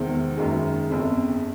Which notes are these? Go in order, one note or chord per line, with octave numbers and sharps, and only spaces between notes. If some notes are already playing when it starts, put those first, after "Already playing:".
Already playing: E2 C3 D#3 G#3 C4
F#1 F#2 D#3 G#3
G1 F2 C#3